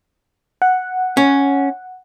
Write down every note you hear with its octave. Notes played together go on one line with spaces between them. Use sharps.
F#5
C#4